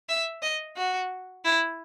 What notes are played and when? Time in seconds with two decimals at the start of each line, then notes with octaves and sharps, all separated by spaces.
0.09 E5
0.42 D#5
0.76 F#4
1.45 E4